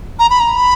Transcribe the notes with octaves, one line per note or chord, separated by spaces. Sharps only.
A#5
B5
A#5
B5